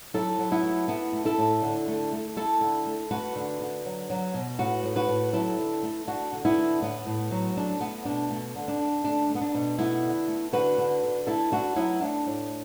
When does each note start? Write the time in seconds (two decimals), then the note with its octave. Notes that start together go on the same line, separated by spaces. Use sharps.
0.14 F#3 E4 A4
0.39 F#3
0.51 B3 E4
0.63 A3
0.88 A3 B3 E4
1.13 A3
1.25 E4 A4
1.38 A2
1.62 D3
1.88 A3
2.12 A3
2.37 A3 E4 A4
2.61 D3
2.85 A3
3.11 A3 F#4 B4
3.36 D3
3.61 D3
3.85 F#3
4.10 F#3
4.34 B2
4.59 A2 F#4 B4
4.84 A2
4.96 F#4 B4
5.08 A2
5.33 F#3 E4 A4
5.59 D3
5.83 A3
6.07 A3 D4 F#4
6.33 D3
6.45 B3 E4
6.57 A3
6.81 A2 B3
7.07 A2
7.31 F#3
7.56 A3 D4
7.81 A3 B3
8.05 B2 D4
8.31 A3
8.55 D3
8.68 D4
8.79 D3
9.04 A3 D4
9.29 A3
9.35 B3
9.42 D4
9.55 B2
9.79 A3 B3 E4
10.03 D3
10.28 A3
10.53 D3 F#4 B4
10.78 D3
11.03 D3
11.27 A3 E4 A4
11.52 A3 D4 F#4
11.76 F#3 B3 E4
12.01 A3 D4
12.26 A2